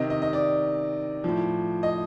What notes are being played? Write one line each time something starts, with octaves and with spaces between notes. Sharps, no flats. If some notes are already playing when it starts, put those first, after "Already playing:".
Already playing: C3 D#3 D#5
D#5
D#5
D5
A2 F3
D#5